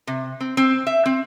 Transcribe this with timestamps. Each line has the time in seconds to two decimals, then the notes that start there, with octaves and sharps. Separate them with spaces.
0.07 C3
0.40 C4
0.57 C4
0.87 E5
1.06 C4